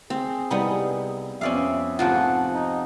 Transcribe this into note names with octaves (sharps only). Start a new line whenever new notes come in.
C4 G#4
C2 G3 B3 D#4
F2 B3 C#4 D5 E5 F5
G#2 C3 F3 A3 F4 F#5
D#4